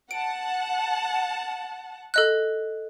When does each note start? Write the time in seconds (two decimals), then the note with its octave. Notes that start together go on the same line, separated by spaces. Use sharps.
0.11 F#5 A5 D7
2.14 A4 D#5 F#6